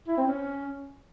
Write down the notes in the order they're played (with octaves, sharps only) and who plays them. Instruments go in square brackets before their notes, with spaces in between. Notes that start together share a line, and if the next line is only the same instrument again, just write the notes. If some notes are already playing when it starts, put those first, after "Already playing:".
[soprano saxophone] E4
C4
C#4